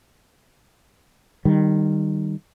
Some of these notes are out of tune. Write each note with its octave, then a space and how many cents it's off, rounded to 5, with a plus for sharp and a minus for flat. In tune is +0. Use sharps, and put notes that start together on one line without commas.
D#3 -15 G3 +0